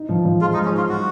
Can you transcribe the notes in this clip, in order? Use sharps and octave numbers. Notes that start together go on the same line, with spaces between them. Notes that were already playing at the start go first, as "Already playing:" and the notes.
Already playing: D#4
F3
F3
G#3 F4
D#4
G#3
C#4
D#4 F4
F#3 F#4